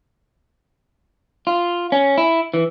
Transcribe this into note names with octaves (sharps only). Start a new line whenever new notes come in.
F4
C#4
E4
E3